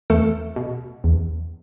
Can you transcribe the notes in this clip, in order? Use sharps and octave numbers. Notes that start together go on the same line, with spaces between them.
E2 A3 A4
B2
E2